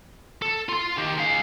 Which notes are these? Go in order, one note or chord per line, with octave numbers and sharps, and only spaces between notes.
A4
F4 C6
D#3 G4
G#3 F5